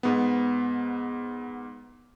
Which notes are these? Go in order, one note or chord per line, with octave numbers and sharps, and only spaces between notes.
G#2 B3